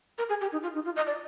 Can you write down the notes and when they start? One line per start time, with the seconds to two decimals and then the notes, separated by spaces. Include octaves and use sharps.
0.18 A#4
0.29 G#4
0.41 G4
0.52 D#4
0.63 F4
0.75 D#4
0.85 F4
0.96 D#5
1.07 D5